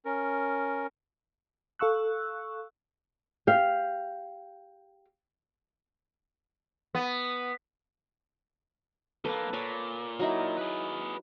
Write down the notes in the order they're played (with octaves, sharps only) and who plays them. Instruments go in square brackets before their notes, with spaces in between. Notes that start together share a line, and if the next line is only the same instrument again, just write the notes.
[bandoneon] C#4 A#4
[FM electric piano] A4 F5 C#6 E6 F#6
[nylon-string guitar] G4 F5
[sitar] B3
[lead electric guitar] B1 A#3 [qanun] A4 B4
[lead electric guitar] A#2 [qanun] C#5 B5
[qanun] F#3 D#4 E4
[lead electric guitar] G#4 B4